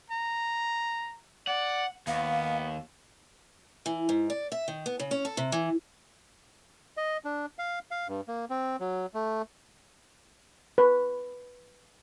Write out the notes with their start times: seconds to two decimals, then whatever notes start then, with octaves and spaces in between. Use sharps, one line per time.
0.10 A#5
1.47 D5 F#5
2.07 D#2 B3 F5
3.86 E3
4.09 G#2
4.30 D5
4.52 E5
4.68 D#3
4.86 B3
5.00 C#3
5.11 C#4
5.25 A4
5.37 C3
5.52 E3
6.97 D#5
7.25 D4
7.59 F5
7.91 F5
8.08 G2
8.28 A#3
8.50 C4
8.80 F#3
9.14 A3
10.78 B4